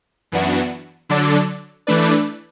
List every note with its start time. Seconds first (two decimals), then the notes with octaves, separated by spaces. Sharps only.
0.32 F#2 E3 B3 D4 F#4
1.09 D3 F#3 D4 A4 D5
1.87 E3 A3 D4 B4 D5